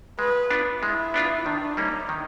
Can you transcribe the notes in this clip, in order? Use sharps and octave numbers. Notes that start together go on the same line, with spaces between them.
G#3 B4
B3 D4 F4
G#3 E4
B3 D4 F4
D#3 D4
G3 A#3 C#4 D#4
D#3